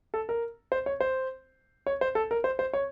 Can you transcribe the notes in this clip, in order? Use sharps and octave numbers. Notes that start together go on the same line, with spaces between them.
A4
A#4
C5
C#5
C5
C#5
C5
A4
A#4
C5
C5
C#5